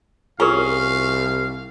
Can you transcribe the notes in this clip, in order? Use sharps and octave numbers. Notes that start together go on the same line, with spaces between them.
C2 C#4 F4 G#4 A#4 F5